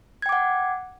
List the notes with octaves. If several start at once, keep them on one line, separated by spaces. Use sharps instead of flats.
F#5 G5 D6 G#6